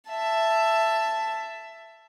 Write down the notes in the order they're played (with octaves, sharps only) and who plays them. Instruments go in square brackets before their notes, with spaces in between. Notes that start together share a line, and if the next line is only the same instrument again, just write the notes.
[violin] E5 A5